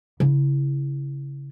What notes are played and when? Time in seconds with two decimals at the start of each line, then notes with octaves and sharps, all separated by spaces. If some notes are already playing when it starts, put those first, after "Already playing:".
0.20 C#3 E4